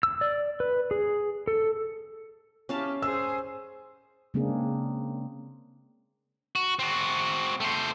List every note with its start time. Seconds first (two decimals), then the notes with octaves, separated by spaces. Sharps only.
0.03 E6
0.21 D5
0.60 B4
0.91 G#4
1.47 A4
2.69 C#4 E4 G4 F5 A5
3.02 G#4 C5 E6
4.34 C#3 G#3 A#3 C4 D4 G#4
6.55 F#4
6.79 C4 F#4
7.60 A3 C5